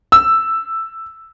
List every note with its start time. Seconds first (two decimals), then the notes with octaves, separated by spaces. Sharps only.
0.12 E6